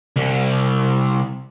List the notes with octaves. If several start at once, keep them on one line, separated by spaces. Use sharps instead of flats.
C2